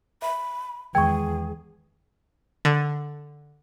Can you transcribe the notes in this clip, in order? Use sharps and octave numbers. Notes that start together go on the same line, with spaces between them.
E5 B5
E2 D#3 G#3 G#4 G5 C#6 G#6
D3